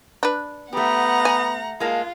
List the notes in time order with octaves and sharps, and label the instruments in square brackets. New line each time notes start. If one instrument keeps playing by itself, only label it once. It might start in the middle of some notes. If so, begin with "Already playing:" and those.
[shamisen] D4 B4
[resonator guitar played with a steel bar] A3 G4 [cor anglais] B3 [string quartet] F#5 A#5
[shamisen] G#5
[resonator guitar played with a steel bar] G#3 A#3 A5 [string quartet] F4